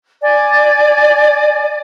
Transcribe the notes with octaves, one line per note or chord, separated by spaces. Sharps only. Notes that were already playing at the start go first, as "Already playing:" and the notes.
D5 G#5